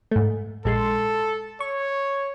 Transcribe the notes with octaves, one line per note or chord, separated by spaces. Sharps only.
G#2 A3
A#1 G#3 A4 C6
C#5 C#6